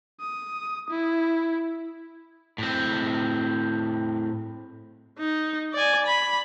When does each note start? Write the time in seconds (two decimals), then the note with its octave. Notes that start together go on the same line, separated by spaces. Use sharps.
0.20 D#6
0.90 E4
2.58 A2 C4
5.19 D#4
5.74 D5 G#5
6.06 B5